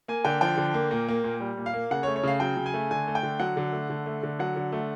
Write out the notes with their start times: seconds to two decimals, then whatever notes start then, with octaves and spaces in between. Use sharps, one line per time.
0.08 A#3 G#5
0.25 D3 G5
0.41 F3 G5
0.58 D3
0.74 A#3
0.91 A#2
1.08 A#3
1.24 A#2
1.41 G3
1.58 A#2
1.66 F5
1.74 A#3
1.91 C#3 F#5
2.03 C#5
2.07 A3
2.16 C#5
2.24 C#3 F5
2.40 F#3 G5
2.57 C#3
2.66 G#5
2.74 A3
2.91 D3 G#5
3.07 A3
3.15 G5
3.23 D3
3.40 F#3 F#5
3.57 D3
3.73 A3
3.90 D3
4.06 A3
4.23 D3
4.39 F#3 F#5
4.56 D3
4.72 A3